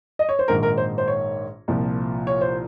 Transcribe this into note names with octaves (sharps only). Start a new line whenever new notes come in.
D#5
C#5
C5
A#1 G#2 D#3 A#4
A#4
C5
C5
C#5
C2 A#2 F3
C#5
C5